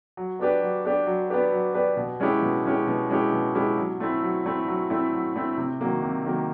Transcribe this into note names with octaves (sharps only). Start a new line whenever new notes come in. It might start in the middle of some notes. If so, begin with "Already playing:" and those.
F#3
B3 D4 G4 B4
F#3
B3 D4 G4 B4
F#3
B3 D4 G4 B4
F#3
B3 D4 G4 B4
B2
G#3 C#4 E4 G4
B2
G#3 C#4 E4 G4
B2
G#3 C#4 E4 G4
B2
G#3 C#4 E4 G4
F#3
A3 C4 E4
F#3
A3 C4 E4
F#3
A3 C4 E4
F#3
A3 C4 E4
C3
D#3 F#3 A#3
C3
D#3 F#3 A#3